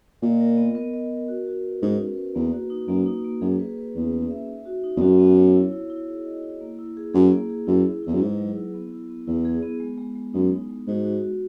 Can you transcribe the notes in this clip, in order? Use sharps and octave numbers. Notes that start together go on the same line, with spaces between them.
A#2 D#5
A#4
B3
B3
D#5
A#4
F#4
F#4
B4
G#2 C#4
B4
B4
E2 A#3
F#4
D#4
F#2 A#3
D#4
A#3
F#2 G#4
B4
B4
E2 C#4
B4
E5
D#4
F#4
D#4
E2
F#2 F#4
B3
C#5
E4
E4
E4
G#4
D#5
E4
A#3
E4
G#4
F#2 G#4
A#3
G#4
F#2 E4
E4
E2 E4
F#2
G#2 B4
F#3
E4
B3
E4
B3
E2 E4
G#4
B3
G#3
G#3
G#3
F#2 D#4
D#4
G#3
G#2 F#4
F#4
F#4